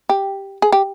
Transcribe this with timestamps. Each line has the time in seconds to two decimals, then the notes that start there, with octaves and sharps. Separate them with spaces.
0.09 G4
0.62 G#4
0.72 G4